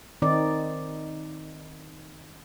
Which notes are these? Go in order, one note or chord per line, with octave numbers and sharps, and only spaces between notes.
D#3 C4 D#4 D5